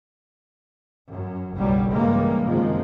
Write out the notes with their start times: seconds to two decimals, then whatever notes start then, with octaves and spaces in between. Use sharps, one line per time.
1.09 F#2
1.55 F#1 B1 F#3 G3
1.91 G2 C#3 E3 G3 G#3 A#3
2.42 F#1 C3 D#3 F3 G#3